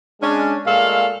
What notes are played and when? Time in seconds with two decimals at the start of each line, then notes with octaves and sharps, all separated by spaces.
0.22 G#3 C#4 D4
0.66 A#2 G#3 A3 A4 F5